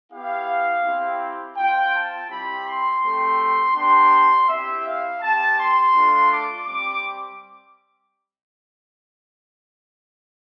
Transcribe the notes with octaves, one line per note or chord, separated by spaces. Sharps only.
B3 E4 G4 F5
C4 E4 G4
C4 F4 G5
A5
G3 C4 E4 G4 B5
C6
A3 C4 G4
B3 D4 G4 C6
C4 E4 G4 E5
F5
C4 G4 A5
C6
A3 D4 F4
D6
G3 C4 D6